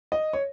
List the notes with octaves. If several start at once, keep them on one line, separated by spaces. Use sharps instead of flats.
D#5
C#5